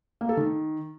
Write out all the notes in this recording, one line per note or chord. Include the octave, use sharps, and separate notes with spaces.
A#3
A4
D#3